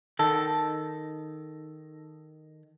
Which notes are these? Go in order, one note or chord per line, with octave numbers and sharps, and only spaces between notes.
D#3 A4